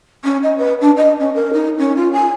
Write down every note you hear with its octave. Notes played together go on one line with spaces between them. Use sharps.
C#4
D#5
B4
D4
D#5
C#4
A#4
D#4
C#4
F4
G#5